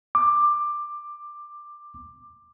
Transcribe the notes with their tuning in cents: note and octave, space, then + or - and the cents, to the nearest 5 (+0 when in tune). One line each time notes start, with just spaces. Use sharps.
D6 +15